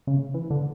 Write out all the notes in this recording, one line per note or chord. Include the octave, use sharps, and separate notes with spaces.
C#3
E3
D3